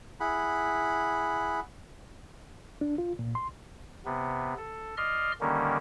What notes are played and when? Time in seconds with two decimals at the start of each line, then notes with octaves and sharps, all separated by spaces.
0.20 E4 G#4 F#5 B5
2.81 D4
2.98 F4
3.19 A#2
3.35 C6
4.05 C3 B3
4.57 A4
4.97 D5 D#5 C6 F6
5.41 D3 D#3 G3 A#3 C#4